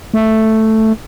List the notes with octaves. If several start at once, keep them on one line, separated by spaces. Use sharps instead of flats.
A3